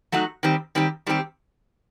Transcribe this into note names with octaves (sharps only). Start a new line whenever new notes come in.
F#3 A3 D#4 F#4
D#3 G3 C4 G4
D#3 G3 C4 G4
D#3 G3 C4 G4